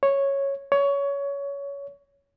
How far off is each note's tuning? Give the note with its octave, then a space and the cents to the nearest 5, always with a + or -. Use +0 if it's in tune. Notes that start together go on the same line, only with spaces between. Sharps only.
C#5 -5
C#5 +20